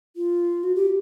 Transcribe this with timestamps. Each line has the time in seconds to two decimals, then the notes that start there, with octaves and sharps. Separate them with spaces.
0.16 F4
0.63 F#4
0.75 G4